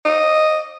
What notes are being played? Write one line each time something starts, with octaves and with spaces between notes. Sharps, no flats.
D#5